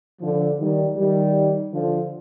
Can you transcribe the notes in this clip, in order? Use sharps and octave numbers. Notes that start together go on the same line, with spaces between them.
D3 F3
D#3 G3
D#3 G3
D3 F3